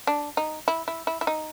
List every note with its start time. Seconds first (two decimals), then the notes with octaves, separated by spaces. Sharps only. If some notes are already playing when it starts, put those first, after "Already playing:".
0.07 D4
0.37 D#4
0.68 E4
0.88 E4
1.07 E4
1.21 E4
1.27 D#4